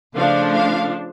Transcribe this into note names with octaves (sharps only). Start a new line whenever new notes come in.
C#3 F3 A3 D4 F5
F5